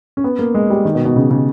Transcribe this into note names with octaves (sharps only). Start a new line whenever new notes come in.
C#4
B3
A#3
G#3
G3
D#3
B2
B2
C#3
C#3